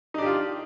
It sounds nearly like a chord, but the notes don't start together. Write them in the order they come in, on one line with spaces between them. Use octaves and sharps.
D#4 D4 G4 F4